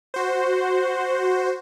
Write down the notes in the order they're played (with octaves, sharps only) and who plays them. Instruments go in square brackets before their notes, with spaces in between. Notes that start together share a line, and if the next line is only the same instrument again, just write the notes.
[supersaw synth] F#4 C5